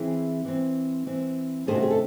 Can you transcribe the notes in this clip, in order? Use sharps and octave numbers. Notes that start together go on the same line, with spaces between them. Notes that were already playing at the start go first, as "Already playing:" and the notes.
Already playing: E3 C4 E4 G#4
E3 C4
E3 C4
C3 D#3 A3 C#4 G#4 C5
F#4
G#4
A4